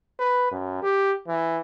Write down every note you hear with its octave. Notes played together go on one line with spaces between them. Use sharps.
B4
F#2
G4
E3